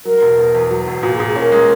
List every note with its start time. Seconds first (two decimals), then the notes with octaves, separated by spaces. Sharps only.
0.05 F#3 A#4
0.22 E1
0.38 B2
0.55 E2
0.71 F#3
0.87 E1
1.03 A#2 F#4
1.15 G#4
1.20 A#2
1.27 G#4
1.36 C#4 A#4
1.52 G#3